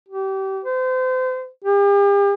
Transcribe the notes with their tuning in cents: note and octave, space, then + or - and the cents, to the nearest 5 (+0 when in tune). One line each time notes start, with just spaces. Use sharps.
G4 -30
C5 -35
G4 +40